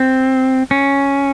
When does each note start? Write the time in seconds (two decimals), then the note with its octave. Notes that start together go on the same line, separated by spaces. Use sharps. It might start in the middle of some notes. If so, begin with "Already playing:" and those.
Already playing: C4
0.71 C#4